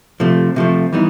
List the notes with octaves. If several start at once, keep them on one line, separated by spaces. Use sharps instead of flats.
C3 F3 A3
C3 F3 A3
E3 G3 B3 D#4